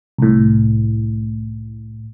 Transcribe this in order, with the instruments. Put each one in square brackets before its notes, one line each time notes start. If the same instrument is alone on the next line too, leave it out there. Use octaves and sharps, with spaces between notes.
[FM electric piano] C2 A2